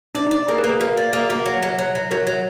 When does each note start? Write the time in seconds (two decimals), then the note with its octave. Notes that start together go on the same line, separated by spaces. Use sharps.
0.15 D4 D5
0.27 D#4 D5
0.48 A#3 G#4
0.58 G#4 B4
0.64 A#3
0.69 G#4 B4
0.80 A#3 F#4 A#4
0.97 D5
1.13 A#3 G#4
1.29 A#3 F#4
1.46 F#3
1.63 F#3
1.79 F#3
1.95 F#3
2.11 F#3 F#4 A#4
2.27 F#3